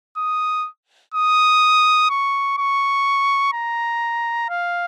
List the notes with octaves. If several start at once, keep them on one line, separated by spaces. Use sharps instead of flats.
D#6
D#6
C#6
C#6
A#5
F5